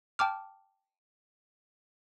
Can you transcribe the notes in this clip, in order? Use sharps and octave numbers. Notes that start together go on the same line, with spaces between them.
G5 A5 D6 F6